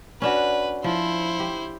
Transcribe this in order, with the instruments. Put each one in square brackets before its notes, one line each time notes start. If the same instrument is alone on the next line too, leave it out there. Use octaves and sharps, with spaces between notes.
[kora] C#4 D4 F#4 [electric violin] B4
[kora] F3 [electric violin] E4 C5
[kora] G4